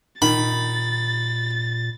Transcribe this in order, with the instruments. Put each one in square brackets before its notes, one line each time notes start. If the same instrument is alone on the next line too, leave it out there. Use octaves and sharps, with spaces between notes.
[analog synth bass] A#2 [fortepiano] D#3 [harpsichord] B5 [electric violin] A6